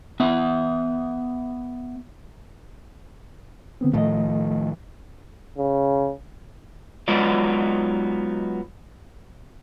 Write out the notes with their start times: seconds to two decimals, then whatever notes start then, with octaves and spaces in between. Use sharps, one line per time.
0.20 B3 E5
3.81 D3 B3 C4
3.94 A2 D#3 F3 A3 D#5
5.58 C#3
7.08 F#3 G#3 B3 D#4 F4 D5